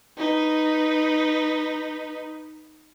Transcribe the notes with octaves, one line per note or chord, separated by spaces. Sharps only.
D#4 B4